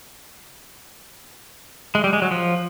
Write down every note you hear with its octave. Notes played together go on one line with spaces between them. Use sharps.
G#3
G3
G#3
F#3
F3